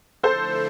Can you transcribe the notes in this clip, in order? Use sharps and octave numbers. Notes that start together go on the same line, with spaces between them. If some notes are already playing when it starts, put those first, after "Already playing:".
D3 F3 A3 E4 A4 C5